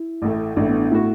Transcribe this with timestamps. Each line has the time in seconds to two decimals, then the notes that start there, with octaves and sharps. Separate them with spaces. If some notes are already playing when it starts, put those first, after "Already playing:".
Already playing: E4
0.22 A1 A2 A3
0.56 A1 A2 A3 D4
0.68 B3
0.80 D4
0.91 A2 A3 E4 F#4